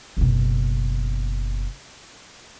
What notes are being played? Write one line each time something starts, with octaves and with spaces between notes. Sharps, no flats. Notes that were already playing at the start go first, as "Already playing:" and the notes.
F#1 B2